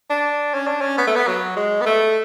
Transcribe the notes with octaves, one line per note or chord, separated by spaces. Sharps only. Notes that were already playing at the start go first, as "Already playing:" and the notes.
D4
C#4
D4
C#4
B3
A3
B3
F#3
G#3
B3
A3